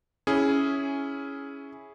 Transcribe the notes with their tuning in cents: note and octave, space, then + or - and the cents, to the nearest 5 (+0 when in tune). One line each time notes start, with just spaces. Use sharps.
C#4 +5 E4 -5 G#4 +0